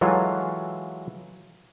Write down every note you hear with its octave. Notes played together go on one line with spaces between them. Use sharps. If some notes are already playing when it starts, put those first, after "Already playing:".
E3 F#3 G#3 F4 F#4 A4